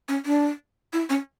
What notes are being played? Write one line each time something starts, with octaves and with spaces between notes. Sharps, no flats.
C#4
D4
E4
C#4